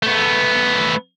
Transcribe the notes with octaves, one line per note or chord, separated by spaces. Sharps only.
A3 B3